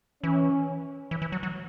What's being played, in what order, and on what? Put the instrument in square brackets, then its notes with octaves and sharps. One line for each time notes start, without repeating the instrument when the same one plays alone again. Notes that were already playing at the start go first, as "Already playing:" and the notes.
[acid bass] E3 [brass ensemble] C#4
[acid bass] E3
E3
F#3
F#3